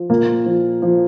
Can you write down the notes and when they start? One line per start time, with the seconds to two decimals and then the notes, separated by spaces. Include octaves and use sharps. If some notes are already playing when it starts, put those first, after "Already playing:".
Already playing: F3
0.09 A#2 A#3
0.46 F3
0.82 F3